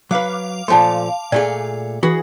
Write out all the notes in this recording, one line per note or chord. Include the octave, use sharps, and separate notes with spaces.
F#3 B4 F5 D6
A#2 F3 A3 A5 C6
A#2 A3 G#4 D5
E3 F#4 G#4 B5